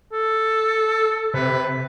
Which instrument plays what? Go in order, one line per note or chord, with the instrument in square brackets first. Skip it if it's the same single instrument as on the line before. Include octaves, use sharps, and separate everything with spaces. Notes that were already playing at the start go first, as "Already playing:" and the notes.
[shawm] A4
[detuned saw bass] C3 [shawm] B4